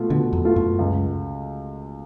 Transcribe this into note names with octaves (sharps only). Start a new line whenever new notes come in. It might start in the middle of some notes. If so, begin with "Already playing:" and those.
Already playing: B2 A3 F4
B2 D3
F2
A3 F4
F#2
C#2